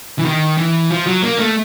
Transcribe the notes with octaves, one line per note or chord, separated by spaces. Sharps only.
E3
D#3
E3
F3
F#3
A#3
A3